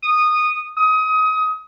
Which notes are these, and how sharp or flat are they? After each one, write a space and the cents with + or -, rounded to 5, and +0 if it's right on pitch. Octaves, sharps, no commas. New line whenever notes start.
D#6 -15
D#6 +25